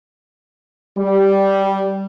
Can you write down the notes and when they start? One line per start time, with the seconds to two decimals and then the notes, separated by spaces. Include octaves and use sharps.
0.98 G3